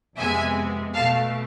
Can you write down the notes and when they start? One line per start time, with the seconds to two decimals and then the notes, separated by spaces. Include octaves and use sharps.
0.17 F2 C3 G#3 B3 E5 G#5
0.94 B2 A3 F5 A5